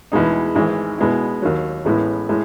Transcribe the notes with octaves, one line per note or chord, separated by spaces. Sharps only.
E2 B2 G#3 D#4
G#1 G#2 E3 G#3
B2 G#3 B3 E4
D#2 D#3 F#3
A1 A2 G#3 B3 E4
A2 G#3